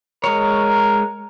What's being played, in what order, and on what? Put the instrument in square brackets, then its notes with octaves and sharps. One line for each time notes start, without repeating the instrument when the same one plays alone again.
[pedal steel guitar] G#3 C#5 [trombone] A#4